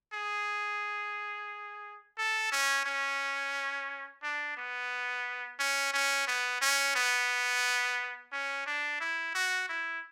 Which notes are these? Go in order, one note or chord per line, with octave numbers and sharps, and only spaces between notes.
G#4
A4
C#4
C#4
D4
B3
C#4
C#4
B3
C#4
B3
C#4
D4
E4
F#4
E4